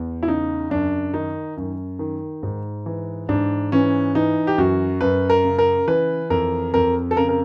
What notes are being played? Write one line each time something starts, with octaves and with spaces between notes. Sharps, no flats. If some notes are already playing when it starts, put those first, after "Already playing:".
Already playing: E2
E4
C#3 D#4
F#2 D4
D#3 D#4
F#2
D#3
G#2
E3
G#2 D4
E3 C#4
E3 D#4
G4
F#2 F#4
F#2 B4
A#4
C#3
A#4
E3 B4
F2 A#4
F2 A#4
A4
C#3 A#4
A#4